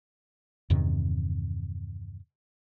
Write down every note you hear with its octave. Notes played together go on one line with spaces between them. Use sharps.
E2 G2 C3 D#3